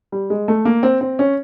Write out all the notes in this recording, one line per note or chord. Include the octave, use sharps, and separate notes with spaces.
G3
G#3
A3
A#3
C4
C4
C#4